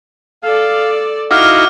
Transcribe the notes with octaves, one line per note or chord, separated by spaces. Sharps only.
A4 D5 F5
D#4 E4 F#4 F5 D6 F6